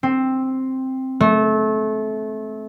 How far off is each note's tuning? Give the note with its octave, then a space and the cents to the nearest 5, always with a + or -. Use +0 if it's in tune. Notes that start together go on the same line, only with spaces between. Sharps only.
C4 +5
A3 -25